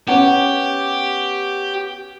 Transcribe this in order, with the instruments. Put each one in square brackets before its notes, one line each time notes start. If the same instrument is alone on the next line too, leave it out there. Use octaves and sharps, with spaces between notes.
[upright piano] B3 C#4 F#5 [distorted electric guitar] G4